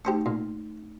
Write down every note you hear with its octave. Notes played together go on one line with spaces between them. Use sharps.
A3 D#4 G4 C5 C#6
A#2